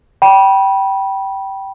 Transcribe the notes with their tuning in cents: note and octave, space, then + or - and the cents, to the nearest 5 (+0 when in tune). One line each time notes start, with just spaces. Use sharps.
G5 -15 B5 -25